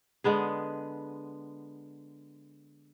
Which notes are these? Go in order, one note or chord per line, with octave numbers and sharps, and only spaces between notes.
D3 G#3 B3 G#4